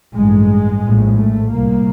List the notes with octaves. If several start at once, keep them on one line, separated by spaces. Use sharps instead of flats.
A1 G2 G#3
A#1 A2
A3
C2 A#2 A#3